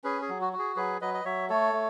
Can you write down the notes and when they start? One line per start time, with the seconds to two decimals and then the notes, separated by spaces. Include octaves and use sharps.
0.04 C#4 G#4 B4
0.22 G#4
0.29 F#3
0.41 F#4
0.53 F#4
0.59 G#4
0.76 F#3 G#4 B4
1.01 F#3 B4 D#5
1.14 D#5
1.25 F#3 C#5 E5
1.49 A3 A4 C#5
1.73 A3